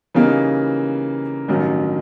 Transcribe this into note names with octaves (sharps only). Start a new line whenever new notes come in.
C#3 E3 G3 A#3 D#4
A1 G2 D#3 F#3